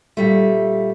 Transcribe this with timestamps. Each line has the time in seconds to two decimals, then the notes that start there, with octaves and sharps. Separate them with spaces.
0.17 A#2 G3 A3